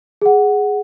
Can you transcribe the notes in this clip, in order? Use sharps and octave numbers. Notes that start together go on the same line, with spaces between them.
G#4 F#5